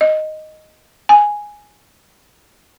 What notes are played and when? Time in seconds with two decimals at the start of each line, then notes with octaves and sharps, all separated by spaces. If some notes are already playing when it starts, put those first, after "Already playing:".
0.01 D#5
1.09 G#5